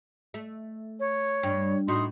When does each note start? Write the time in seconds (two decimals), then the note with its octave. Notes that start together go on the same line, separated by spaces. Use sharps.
0.34 A3
1.00 C#5
1.43 G2
1.88 A2 D#4 F#4 C6 D#6